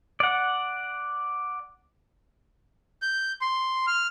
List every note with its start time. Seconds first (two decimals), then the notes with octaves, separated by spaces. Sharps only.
0.20 D5 F#5
3.02 G6
3.41 C6
3.87 F6